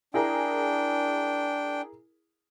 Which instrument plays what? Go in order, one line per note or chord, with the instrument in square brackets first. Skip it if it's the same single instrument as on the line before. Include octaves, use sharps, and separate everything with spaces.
[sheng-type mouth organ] D4 G5 [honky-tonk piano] E4 G#4 A#4